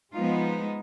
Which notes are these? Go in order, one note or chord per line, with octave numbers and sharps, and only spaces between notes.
F3 G#3 B3 D#4 F4